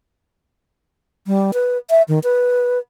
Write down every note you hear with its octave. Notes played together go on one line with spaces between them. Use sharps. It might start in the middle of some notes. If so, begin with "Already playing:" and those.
G3
B4
E5
D#3
B4